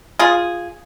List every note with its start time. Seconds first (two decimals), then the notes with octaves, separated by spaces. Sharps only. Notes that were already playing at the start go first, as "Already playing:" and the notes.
0.19 F4 G#4